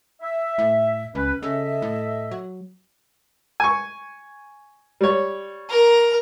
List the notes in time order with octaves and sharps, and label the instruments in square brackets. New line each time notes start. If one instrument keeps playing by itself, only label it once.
[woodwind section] E5
[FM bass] A2
[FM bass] C#2 [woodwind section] C#4 B4
[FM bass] C#3 [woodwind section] A4 D#5 E5
[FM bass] A2
F#3
[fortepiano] G#5 C#6
G3 C#5
[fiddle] A#4 A#5